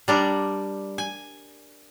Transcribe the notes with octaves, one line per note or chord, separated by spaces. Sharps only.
G3 D4 A#4
G#5